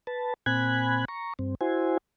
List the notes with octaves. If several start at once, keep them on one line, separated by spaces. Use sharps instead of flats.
B4 A5
A#2 C4 G#5 B5 F#6 G#6
A#5 C#6
G2 C4
E4 F#4 C5 G#5